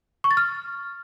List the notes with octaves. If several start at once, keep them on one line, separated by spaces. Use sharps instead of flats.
C#6
A6
F6